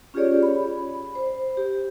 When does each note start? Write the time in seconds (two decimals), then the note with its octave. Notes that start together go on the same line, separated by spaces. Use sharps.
0.14 C#4 F4 G4 G#4 C#5 D5
0.43 B5
1.15 C5
1.57 G4